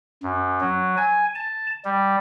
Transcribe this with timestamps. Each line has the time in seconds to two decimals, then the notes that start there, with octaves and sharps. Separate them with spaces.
0.23 F#2
0.61 F#3
0.97 G#5
1.35 A5
1.85 G3